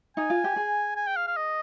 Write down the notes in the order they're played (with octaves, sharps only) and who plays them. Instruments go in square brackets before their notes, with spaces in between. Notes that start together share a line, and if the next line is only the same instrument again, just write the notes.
[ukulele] D#4 [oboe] G#5
[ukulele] F4
G4
G#4
[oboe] G#5
G5
F5
F5
D#5